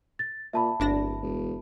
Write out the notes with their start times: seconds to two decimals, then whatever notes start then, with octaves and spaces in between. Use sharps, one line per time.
0.19 A6
0.53 A#2 E5 A5 B5
0.80 D1 G1 D4 A#6
1.22 E1